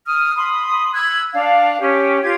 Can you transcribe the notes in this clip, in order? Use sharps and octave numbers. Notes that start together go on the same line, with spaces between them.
D#6 F6
B5 C6 D#6
B5 E6 F#6 G#6
D4 F5
C#4 G4
F4 G4 G#6